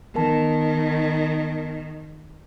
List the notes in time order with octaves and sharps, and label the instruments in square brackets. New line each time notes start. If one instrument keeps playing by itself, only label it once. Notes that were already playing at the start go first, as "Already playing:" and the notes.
[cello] D#3 [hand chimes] B3 A#4 A5